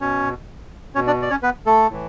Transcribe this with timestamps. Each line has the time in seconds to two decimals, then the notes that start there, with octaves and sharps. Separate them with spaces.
0.01 B2 C#4 C#5
0.95 B2 C#4 C#5
1.07 D4 D5
1.22 D5
1.30 C#4 C#5
1.43 B3 B4
1.66 A3 A4
1.89 A2 E3